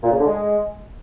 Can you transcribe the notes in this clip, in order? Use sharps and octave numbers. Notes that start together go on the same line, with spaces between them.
A#2
C#3
D3
G#3